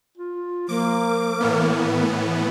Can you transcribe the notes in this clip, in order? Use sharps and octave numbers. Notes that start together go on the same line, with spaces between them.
F4
F3 A#3 D6
A2 E3 B3
D#3